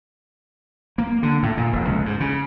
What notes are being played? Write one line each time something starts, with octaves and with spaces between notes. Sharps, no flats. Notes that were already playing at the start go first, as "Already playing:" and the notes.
A#3
D3
A2
A#2
F1
C#2
G#2
C#3